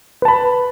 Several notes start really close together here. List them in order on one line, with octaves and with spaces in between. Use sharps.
B4 A5 B5